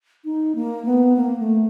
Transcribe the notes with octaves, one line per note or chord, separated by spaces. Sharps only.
D#4
A#3
B3
A#3
A3